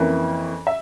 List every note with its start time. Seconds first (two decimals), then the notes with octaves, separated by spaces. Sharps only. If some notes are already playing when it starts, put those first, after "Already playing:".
Already playing: F2 E3 A#3 C#4
0.67 E5